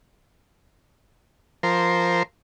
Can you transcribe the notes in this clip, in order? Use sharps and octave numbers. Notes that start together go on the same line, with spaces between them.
F3 A#4 C5